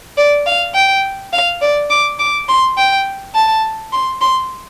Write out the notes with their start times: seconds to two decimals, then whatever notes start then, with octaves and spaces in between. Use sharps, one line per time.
0.18 D5
0.47 F5
0.75 G5
1.33 F5
1.62 D5
1.90 D6
2.19 D6
2.49 C6
2.78 G5
3.35 A5
3.93 C6
4.21 C6